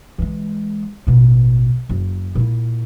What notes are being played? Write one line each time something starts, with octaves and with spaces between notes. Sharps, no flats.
E3 G#3
A1 B2
F#1
A#2 E4